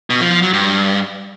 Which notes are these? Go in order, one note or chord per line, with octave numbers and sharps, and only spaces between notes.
B2
F3
F3
F#3
G2